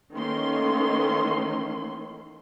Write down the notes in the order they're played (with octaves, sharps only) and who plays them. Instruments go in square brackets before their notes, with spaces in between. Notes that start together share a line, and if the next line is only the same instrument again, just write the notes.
[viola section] D#3 E3 A3 A#3 C#4 C6